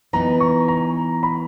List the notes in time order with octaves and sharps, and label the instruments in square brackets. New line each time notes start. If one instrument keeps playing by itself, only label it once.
[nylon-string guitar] E3 B3 D#4 [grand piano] A#5
[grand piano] C#6
A#5
B5